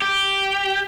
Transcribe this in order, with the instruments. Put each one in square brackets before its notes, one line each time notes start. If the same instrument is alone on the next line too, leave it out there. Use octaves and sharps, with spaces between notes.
[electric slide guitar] G4